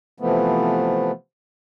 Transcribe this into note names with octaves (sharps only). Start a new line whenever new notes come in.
C3 E3 F3 A3 B3